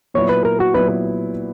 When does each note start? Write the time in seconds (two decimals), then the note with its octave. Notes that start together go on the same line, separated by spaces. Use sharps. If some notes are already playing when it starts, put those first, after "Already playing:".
0.14 A#2 F#3 B3 E4 C#5
0.29 B4
0.45 A#4
0.60 F#4
0.74 A#2 F#3 B3 E4 B4